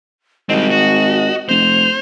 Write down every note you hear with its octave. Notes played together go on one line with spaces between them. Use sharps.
G#1 G3 C4 D#5
F#4
F1 C5 F7